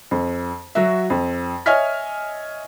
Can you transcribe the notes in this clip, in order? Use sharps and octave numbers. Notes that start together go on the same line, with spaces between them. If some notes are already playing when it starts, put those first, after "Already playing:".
F2
F#3 F#4 E5
F2
C#5 D#5 E5 G#5 F6 B6